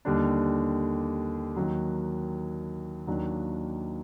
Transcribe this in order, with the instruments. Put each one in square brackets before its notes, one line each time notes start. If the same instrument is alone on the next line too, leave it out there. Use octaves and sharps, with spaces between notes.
[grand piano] D#2 D3 G3 D4
D#2 D#3 F#3
D#2 D#3 F#3 A#3 D4